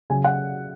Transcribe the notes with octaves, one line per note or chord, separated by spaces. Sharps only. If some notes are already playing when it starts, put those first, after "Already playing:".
C#3 F#3 G#5
F#5